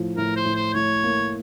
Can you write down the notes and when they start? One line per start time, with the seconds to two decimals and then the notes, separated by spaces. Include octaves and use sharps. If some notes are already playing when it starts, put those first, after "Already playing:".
Already playing: A2 F3
0.17 A2 A#4
0.36 C5
0.45 A2
0.56 C5
0.74 A2 C#5
1.04 A#3